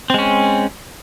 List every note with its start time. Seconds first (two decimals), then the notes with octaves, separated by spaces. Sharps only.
0.10 C4
0.14 G#3
0.18 C#4